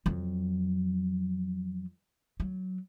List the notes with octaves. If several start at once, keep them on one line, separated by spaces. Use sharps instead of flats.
F2 F#3
F#3